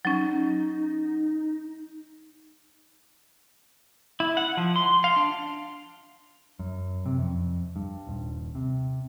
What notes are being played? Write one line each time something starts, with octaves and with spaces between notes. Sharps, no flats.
F#3 C#4 D#4
E4
F#5
F3
C6
F5
D4
F#2
C3
F2
G2
D#1
C3